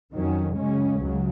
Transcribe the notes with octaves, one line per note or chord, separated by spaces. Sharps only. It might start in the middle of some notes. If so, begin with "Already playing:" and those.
F2 D#3 F#3 C#4
F#2 C#3 G#3 C#4
C#2 C#3 F#3